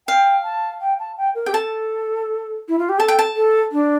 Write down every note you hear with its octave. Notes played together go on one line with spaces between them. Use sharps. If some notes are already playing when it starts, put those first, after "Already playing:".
F5 G5
A5
G5
A5
G5
A#4
G4 G5
A4 A5
E4
F4
G4
A4 A5
G5
A5
A4
D4